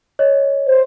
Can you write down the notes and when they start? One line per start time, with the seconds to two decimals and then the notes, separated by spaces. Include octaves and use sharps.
0.19 C#5 D#5
0.66 C5